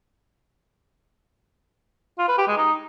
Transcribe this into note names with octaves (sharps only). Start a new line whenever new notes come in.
F4
B4
G4
G#3
D#4